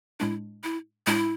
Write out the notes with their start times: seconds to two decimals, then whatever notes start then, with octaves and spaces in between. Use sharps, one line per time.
0.20 A2 G#3 D4 E4
0.63 E4
1.07 A2 G#3 D4 E4